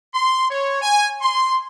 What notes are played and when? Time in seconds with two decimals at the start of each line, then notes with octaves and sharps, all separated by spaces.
0.14 C6
0.50 C#5
0.82 G#5
1.21 C6